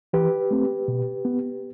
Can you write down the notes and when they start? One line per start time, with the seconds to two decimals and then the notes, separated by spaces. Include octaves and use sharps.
0.13 E3 G4 B4
0.51 A3 C4
0.88 B2
1.25 B3